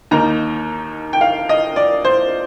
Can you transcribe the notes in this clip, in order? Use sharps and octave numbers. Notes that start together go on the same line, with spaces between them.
D#2 D#3 A#3 D#4 A#5
G5
F5
D#5
D5
C5